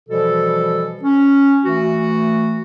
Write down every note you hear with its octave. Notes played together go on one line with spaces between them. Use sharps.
B2 E3 F3 G3 A4
C#4
E3 A3 F#4